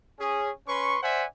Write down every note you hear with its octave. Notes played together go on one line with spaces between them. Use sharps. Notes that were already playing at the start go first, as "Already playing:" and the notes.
C#4 G#4
C#4 B4 C6 C#6
C5 D5 E5 F#5 G#5